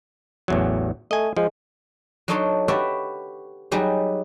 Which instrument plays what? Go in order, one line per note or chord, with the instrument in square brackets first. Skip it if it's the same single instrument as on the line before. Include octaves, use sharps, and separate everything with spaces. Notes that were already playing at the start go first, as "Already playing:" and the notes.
[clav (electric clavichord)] A1 E2 F#3
[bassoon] A3 [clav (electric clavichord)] D#5 G#5
[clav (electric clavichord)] F3 [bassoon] G#3
[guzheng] F#3 D4 D#4 A4 C#5 C6
F#4 G4 B4 C#5 D5 E5
F#3 G3 D#4 G4 G#4